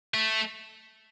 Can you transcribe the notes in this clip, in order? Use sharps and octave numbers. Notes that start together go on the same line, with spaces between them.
A3